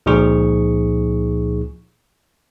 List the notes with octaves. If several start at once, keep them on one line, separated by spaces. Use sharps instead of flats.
C#2 A#2 F3 D#4 G#4 C#6